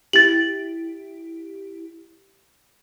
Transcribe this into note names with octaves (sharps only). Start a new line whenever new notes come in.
E4 G4 A6 F#7